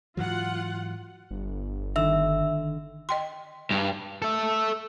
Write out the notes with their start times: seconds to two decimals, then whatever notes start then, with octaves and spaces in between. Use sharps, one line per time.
0.17 G#2 E3 F#3 F4 F#5
1.31 G1
1.96 D3 D#3 E5 E6
3.09 D#5 G5 C6
3.71 G2
4.22 A4 E5